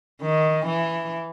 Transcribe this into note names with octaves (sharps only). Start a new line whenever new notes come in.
D#3
E3